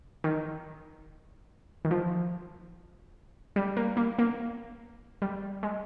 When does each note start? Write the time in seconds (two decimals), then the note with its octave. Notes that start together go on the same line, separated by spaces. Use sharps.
0.24 D#3
1.85 D#3
1.91 F3
3.56 G3
3.77 A#3
3.97 A#3
4.19 A#3
5.22 G3
5.63 G#3